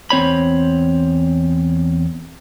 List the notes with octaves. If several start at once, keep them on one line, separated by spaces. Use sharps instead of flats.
E2 C4 C#5 B5